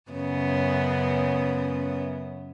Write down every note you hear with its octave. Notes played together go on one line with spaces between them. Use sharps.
F#2 C#3 B3